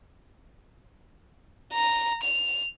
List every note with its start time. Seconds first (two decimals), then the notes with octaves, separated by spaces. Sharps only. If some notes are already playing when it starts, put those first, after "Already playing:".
1.72 A#5
2.23 F7